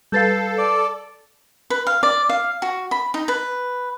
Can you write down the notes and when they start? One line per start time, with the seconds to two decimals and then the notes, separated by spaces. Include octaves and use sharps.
0.12 G3 A4 B4 F5 G6 A6 C7
0.58 D5
1.70 B4
1.87 F5
2.03 D5
2.29 F5
2.62 F#4
2.91 B5
3.14 D#4
3.28 B4